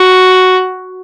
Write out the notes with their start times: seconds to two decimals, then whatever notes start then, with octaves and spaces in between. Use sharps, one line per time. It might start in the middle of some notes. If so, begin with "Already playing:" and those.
Already playing: F#4